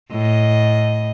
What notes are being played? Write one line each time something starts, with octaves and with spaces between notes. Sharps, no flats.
A2 D#5